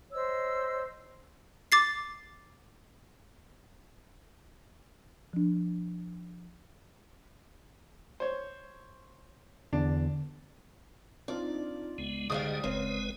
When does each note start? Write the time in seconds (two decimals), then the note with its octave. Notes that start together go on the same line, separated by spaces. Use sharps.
0.12 C5 C#5 D#5 E6
1.72 D6 A6 C7
5.33 F3 D4
8.20 C5 C#5
9.73 E2 D3 D4
11.28 C4 D4 D#4 F4 D5
11.98 C#2 G#3 B3
12.30 G#2 D3 G3 G#4 D#5 F5 D#6
12.64 F#1 C#3 G#3 C4 B4